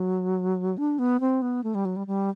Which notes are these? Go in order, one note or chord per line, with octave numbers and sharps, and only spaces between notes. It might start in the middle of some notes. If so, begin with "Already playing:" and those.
Already playing: F#3
D4
B3
C4
B3
A3
G3
F#3
G3
G3